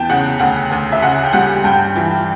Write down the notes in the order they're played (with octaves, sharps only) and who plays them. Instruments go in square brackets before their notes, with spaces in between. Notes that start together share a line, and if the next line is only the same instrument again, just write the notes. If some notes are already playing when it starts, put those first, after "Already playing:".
Already playing: [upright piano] E2 G5 A5
C#3 F#5
D2 F#5
D2
E5
C#3 F#5
G5
G3 F#5
G2 G5
E3